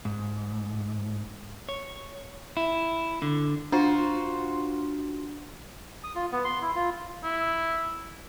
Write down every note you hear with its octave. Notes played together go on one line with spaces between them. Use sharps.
G#2
C#5
E4
D3
D4 F4 F#4 C5
D#6
F4
B3
C6
E4
F4
E4